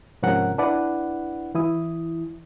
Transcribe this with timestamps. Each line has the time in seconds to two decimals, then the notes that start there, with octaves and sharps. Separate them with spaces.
0.22 G#2 C3 F3 C#4 A#4 F#5
0.58 D4 E4 B4 D5 F#5
1.55 E3 E4 D#6